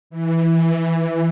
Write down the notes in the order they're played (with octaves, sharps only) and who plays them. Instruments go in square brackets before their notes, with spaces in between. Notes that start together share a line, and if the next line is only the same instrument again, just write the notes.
[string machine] E3